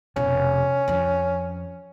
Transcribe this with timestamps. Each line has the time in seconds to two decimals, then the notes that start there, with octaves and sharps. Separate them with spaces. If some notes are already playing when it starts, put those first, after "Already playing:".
0.16 F1 B2 C#4
0.88 F2 F3